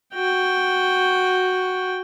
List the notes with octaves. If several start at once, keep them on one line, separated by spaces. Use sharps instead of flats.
F#4 G5